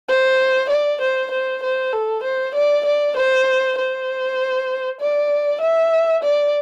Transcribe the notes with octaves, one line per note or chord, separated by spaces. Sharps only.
C5
D5
C5
C5
C5
A4
C5
D5
D5
C5
C5
D5
E5
D5